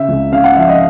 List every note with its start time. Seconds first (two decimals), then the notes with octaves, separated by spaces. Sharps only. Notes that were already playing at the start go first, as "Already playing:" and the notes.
Already playing: C#3 E5
0.09 C#2
0.32 C#3 F5
0.44 F#5
0.56 F3 E5
0.69 D#5